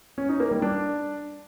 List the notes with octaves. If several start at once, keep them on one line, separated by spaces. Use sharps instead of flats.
C#4
D#4
A#3
G3
D4